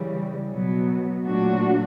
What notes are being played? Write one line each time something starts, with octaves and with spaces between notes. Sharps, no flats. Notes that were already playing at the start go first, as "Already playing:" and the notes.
Already playing: C#3 E3 G3
B2 F#3 B3
A#2 F#3 A3 D4 F#4